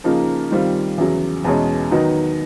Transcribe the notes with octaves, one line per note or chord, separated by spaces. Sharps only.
C#3 F3 A#3 D#4
D#3 G3 C4 F4
E2 C#3 F#3
E2 B2 G#3 C#4
D#3 F#3 B3 D#4